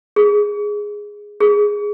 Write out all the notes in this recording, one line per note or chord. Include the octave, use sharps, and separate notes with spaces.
G#4
G#4